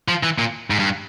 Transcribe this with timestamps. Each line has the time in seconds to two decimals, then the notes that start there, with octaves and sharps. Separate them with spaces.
0.08 F3
0.23 E3
0.39 A#2
0.70 G#2
0.79 G2